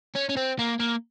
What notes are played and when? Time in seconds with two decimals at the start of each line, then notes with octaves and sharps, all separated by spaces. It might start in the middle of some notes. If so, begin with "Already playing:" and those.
0.15 C#4
0.29 C#4
0.37 C4
0.59 A#3
0.80 A#3